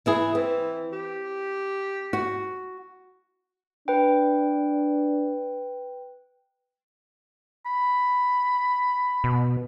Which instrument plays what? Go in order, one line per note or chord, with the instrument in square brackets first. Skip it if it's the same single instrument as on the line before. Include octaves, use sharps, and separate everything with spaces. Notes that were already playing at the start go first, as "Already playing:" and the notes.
[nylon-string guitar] E3 E4 G#4
[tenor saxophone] E3 [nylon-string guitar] C4
[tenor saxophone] G4
[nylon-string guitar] F#4
[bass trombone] D4 [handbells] B4 G5
[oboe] B5
[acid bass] B2